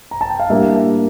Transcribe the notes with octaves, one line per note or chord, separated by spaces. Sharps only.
A#5
A5
G5
F5
A2 G3 A#3 D4 E5